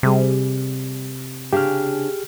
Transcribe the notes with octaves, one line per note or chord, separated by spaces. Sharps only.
C3 G3 G#4
C#3 D4 G4 G#4 G5 F6